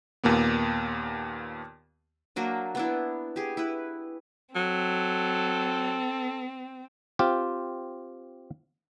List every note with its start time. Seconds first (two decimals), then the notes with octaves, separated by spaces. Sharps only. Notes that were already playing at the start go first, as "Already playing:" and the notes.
0.24 D#2 A#2 A#3 B3
2.36 F#3 A#3 D4
2.75 B3 D4 E4
3.36 G4 G#4
3.57 E4 B4
4.56 F#3 C4 A4
7.19 C4 F4 G4